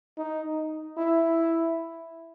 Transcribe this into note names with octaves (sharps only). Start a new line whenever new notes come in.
D#4
E4